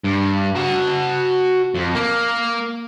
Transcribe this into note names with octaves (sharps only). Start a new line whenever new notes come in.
G2
F#4 A5
F2
A#3